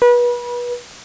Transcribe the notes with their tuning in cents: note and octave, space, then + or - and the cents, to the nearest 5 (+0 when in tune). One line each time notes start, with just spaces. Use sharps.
B4 -30